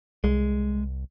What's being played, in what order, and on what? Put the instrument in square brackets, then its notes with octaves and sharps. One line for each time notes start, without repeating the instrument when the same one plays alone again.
[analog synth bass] C2 [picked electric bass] G#3